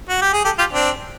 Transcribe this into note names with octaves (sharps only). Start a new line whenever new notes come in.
F#4
G4
G#4
G4 A4
F4 G4
C4 D4